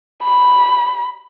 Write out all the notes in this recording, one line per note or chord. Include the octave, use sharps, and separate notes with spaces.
B5